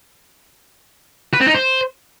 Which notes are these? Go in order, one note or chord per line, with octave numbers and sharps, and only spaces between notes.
B4
C4
D#4
C5